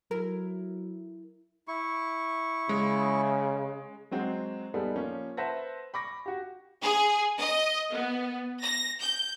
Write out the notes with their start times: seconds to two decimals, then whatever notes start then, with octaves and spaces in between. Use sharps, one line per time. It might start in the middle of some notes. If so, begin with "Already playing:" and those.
0.11 F#3 E4 A#4
1.68 E4 C#6
2.69 C#3 G#3
4.11 F#3 G#3 C4 F#4
4.74 G3 B3 D#4 G#4 A4
4.96 F3 A#3 C#4
5.37 B4 C5 E5 F#5 A5 A#6
5.94 B5 C#6 D6 A#6
6.26 F#4 G4
6.81 G#4
7.39 D#5
7.93 B3
8.62 A#6
9.02 G6